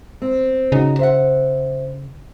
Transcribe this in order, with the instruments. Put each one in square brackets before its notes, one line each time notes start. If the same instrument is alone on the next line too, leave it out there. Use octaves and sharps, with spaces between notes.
[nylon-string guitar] C4
[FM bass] C#3 [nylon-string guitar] D#4 F#4
[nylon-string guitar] C5 E5 F#5